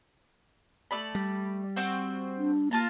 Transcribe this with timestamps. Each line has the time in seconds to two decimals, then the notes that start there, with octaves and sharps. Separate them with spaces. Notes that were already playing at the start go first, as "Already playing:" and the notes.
0.91 A3 D5 B5
1.15 G3
1.76 C4 F#4 C5
2.38 D4
2.71 A#3 F4 A5 A#5